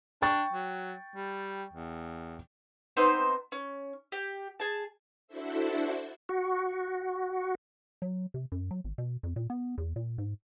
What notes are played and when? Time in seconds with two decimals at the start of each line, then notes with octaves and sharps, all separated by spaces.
0.22 D4 G5 C#6 A6
0.53 F#3
1.16 G3
1.73 E2
2.97 B3 C4 D#4 C5
3.52 C#4
4.12 G4
4.60 G#4 A5
5.27 D4 E4 F#4 A4 C5 E5
6.29 F#4
8.02 F#3
8.34 C3
8.52 F#2
8.71 F#3
8.84 G#1
8.98 B2
9.23 F2
9.36 A#2
9.50 B3
9.78 E2
9.96 A#2
10.18 G#2